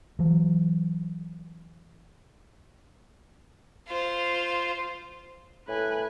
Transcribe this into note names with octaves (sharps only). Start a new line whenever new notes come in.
E3 F#3
F4 C5
A2 B4 G#5